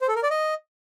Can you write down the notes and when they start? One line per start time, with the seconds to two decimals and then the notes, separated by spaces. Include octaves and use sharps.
0.01 C5
0.08 A4
0.16 A#4
0.23 D5
0.31 D#5